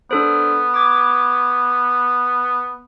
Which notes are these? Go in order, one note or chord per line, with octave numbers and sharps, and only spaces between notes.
B3 D4 A4 C5
D6 G#6